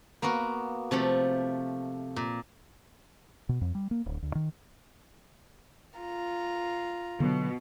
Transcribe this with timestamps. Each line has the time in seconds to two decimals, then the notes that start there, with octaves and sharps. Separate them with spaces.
0.22 A#3 B3 F#4 A#4
0.91 C3 F3 A3 A4
2.16 A#2
3.49 B2
3.61 F2
3.75 G3
3.91 A#3
4.06 D1
4.22 D2
4.35 D#3
6.00 F4 A#5
7.20 B2 D3 F#3